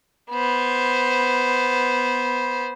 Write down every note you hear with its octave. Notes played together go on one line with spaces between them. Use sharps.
B3 C5